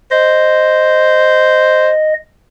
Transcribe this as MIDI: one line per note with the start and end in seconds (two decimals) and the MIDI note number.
0.11 1.92 72
0.11 2.14 75